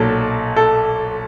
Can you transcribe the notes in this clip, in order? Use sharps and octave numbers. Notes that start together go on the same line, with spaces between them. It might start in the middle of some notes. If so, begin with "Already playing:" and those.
Already playing: B1 A#2 F#3 A4
A4